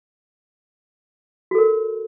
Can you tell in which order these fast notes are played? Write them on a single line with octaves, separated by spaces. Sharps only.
F#4 A4 A#4